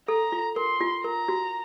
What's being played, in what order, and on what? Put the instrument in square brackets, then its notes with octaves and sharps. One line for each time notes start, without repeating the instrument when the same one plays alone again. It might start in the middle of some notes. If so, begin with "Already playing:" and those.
[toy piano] A4 [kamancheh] A#5
[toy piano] F4
[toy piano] A#4 [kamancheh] C6
[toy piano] F4
[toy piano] A#4 [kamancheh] A#5
[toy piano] F#4